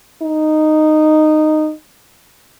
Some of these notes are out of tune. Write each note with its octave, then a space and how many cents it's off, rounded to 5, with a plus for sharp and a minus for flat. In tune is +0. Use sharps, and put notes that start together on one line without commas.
D#4 -10